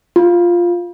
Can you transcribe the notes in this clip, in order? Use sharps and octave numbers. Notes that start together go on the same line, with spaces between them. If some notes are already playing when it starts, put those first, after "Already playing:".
F4